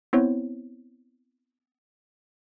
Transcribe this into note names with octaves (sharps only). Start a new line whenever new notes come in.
B3 C4 E4 C5 C#5